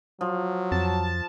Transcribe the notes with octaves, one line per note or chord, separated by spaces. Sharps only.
F3 F#3
F2 A5